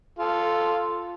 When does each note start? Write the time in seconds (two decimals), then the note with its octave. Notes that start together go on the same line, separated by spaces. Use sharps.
0.19 F4 A4